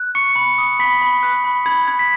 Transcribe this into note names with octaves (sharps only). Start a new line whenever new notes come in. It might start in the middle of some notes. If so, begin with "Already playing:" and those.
Already playing: F#6
C#6 C#7
B5
D#6
B5 B6
B5
F#6
B5
B5 G#6
B5 G#6
B6